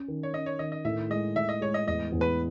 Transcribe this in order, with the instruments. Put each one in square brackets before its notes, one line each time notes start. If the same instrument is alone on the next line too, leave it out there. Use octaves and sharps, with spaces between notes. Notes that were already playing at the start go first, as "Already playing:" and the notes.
Already playing: [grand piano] C#4
D#3
[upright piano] C#5
[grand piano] C#4 [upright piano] D#5
[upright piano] C#5
[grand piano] D#3 [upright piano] D#5
[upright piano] D#5
[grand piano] A2 [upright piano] E5
[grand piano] G#3 [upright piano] D#5
[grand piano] A2 [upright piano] E5
[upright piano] D#5
[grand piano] G#3 [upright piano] C#5
[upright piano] D#5
[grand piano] E2 [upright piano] D#5
[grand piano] E2
[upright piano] B4